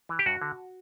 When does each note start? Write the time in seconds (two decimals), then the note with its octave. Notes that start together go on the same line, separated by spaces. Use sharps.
0.09 E3
0.19 G4
0.26 G2 F#4
0.41 D3